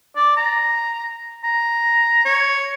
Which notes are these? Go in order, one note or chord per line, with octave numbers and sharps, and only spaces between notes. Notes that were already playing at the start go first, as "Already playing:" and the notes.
D5
A#5
A#5
C#5